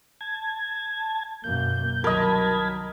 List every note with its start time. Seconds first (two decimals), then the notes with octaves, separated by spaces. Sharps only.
0.21 A5 G#6
1.44 F#2 B2 A#3 G6
2.04 C2 D#3 F#3 A#4 D#5 A5 B5 G#6